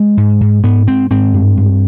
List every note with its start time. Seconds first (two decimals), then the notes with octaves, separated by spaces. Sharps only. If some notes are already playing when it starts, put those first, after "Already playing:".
Already playing: G#3
0.17 G#2
0.41 G#2
0.63 G#2 B3
0.87 G#2 C4
1.10 G#2 C4
1.34 G2
1.57 G2